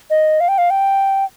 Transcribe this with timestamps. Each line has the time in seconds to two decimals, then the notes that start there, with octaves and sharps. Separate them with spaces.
0.10 D#5
0.40 F5
0.48 G5
0.58 F5
0.70 G5